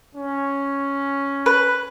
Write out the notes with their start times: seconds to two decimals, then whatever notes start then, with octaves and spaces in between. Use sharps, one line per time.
0.15 C#4
1.46 B4